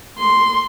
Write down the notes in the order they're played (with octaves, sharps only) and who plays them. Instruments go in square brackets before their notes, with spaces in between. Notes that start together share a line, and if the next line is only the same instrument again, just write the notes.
[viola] C6